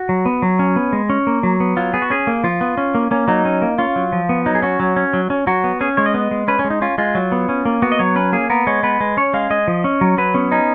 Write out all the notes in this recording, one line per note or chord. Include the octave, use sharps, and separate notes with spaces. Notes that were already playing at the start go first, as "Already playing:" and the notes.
Already playing: F#4
F#3
B3
F#3
C#4
B3
G#3
C#4
A#3
F#3
B3
F#3 F4
B3 G#4
F#4
C#4 G#4
A#3
F3 F4
B3
C#4
A#3
A#3 C#4
F#3 D#4
C#4
A#3
C#4 F4
F#3
F3
B3
F#3 D#4
G#4
C#4 F#4
F#3
C#4
F#3
C#4
F#3 F#4
B3
C#4 G#4
G#3 C#5
D#5
B3
G#3
C#4 B4
C#4
G#3
D#4
C#4 F4
G#3 F4
F#3
B3
C#4
A#3
B3 F#4
D#5
F#3 C#5
C#4 B4
A#3 G#4
B3 A#4
G#3 C#5
B3 B4
G#3
C#4 C#5
G#3 F5
G#3 D#5
F3
C#4
F#3
F#3 B4
B3 C#4
C#4 D#4